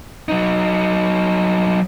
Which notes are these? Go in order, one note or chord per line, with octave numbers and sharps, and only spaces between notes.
F#3 D#4